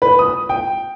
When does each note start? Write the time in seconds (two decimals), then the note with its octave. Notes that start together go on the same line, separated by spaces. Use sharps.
0.02 B4
0.19 D#6
0.49 G5